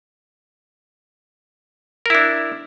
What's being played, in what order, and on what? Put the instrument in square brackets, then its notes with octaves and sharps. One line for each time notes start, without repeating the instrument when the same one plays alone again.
[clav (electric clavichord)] A#4
E4
D4